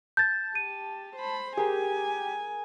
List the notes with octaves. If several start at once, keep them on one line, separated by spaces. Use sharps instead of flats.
A5 G6 A6
G4 D#7
C5 B5
G4 G#4 A#4 G#5